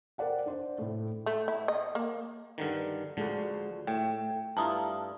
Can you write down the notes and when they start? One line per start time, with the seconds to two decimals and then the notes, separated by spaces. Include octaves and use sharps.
0.18 A#4 C5 D5 F#5 G5
0.46 D4 C5 D5
0.78 A2 A3
1.26 A3
1.48 E4
1.68 D#5
1.95 A#3
2.58 G2 D3 D#3
3.17 D2 D3 F3 G#3 F#4
3.87 A2 A3 G5
4.57 G2 E4 F4 A5 A#5 D#6